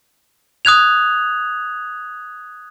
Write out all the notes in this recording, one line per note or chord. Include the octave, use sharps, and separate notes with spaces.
D#6 F#6 G#6 F7